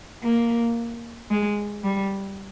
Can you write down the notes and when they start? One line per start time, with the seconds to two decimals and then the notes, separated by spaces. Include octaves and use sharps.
0.24 A#3
1.31 G#3
1.84 G3